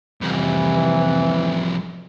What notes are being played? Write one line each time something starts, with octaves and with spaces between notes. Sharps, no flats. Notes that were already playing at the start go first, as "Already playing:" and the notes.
C2 F2 C3 E3